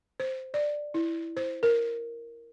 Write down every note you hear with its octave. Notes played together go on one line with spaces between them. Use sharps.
C5
D5
E4
C5
A#4